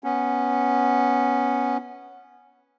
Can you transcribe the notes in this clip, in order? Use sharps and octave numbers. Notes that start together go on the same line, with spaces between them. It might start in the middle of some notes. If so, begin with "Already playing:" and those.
B3 C#4